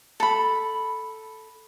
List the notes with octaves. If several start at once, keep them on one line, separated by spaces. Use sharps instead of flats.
A4 B5